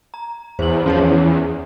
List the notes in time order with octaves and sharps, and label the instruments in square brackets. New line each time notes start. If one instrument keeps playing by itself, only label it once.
[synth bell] A#5
[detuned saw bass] E2 [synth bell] C5 F#7
[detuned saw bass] F3 [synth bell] C#4 G#4 C#5
[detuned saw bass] E2